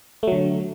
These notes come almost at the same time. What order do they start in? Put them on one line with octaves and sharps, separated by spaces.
A3 F#3 D3